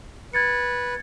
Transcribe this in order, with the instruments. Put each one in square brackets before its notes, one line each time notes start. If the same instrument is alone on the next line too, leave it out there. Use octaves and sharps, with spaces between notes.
[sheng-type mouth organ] B4 [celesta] G#6 A6 C#7